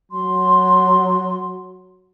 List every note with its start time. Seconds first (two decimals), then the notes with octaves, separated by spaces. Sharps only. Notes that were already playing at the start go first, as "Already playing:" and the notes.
0.12 F#3 C6